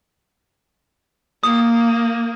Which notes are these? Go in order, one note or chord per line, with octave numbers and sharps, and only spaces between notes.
A#3 D#6